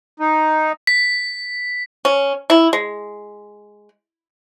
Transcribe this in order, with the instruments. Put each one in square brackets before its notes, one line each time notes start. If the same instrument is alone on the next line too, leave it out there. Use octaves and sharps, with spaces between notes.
[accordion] D#4
[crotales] B6
[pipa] C#4
E4
G#3